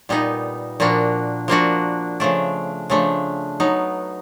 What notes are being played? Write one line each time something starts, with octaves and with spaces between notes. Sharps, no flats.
A#2 G3 B3 D#4
A#2 F3 A#3 D4 F#4
A#2 F3 A#3 D4 F#4
C#3 F3 A3 D4
C#3 F3 A3 D4
F#3 B3 D#4